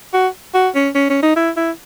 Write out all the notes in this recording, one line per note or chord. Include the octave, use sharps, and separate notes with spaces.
F#4
F#4
C#4
C#4
C#4
D#4
E4
E4